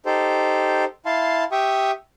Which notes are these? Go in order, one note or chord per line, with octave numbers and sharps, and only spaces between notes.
D#4 G4 A4 C5
E4 F5 A5 C6
G4 E5 G5 C#6 D#6